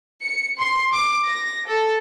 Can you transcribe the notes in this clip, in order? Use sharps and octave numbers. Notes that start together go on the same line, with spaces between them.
C#7
C6
D6
A#6
A4